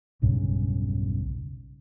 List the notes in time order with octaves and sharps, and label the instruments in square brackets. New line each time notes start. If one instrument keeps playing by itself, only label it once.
[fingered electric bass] E1 B1 G2 C#3